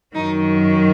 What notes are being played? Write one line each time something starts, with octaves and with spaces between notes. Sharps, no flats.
F#2 D#3 F#3 D#4